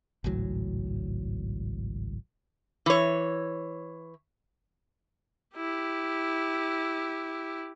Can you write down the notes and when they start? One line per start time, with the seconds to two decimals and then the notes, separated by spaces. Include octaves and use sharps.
0.24 G#1 C#2 A2 F#3
2.86 E3 C#5
5.55 E4 G4